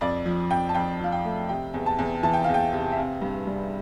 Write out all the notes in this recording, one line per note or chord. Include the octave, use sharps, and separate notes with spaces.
F2 D5
F3
F2 G5
A5
F2 G5
F3 F5
G5
A3
C3 G5
E2
A5
E2
E3 A5
G5
E2 F5
G5
C3
E5
C4 F5
G2
G3